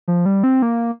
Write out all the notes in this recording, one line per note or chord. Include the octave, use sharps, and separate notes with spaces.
F3
G3
C4
A#3